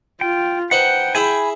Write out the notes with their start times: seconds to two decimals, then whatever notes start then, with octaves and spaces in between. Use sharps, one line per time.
0.21 F4 G5
0.71 D#4 B4 C5 F#5 G5
1.15 E4 G#4 E5 G#5 B5